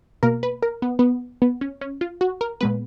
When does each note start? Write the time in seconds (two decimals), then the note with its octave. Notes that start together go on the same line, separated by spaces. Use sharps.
0.23 B2 A#3 A#4
0.43 B4
0.63 A#4
0.82 B3
0.99 B3
1.42 B3
1.61 C#4
1.81 C#4
2.01 F4
2.21 F#4
2.41 A#4
2.61 A#2 G#3 B3 B4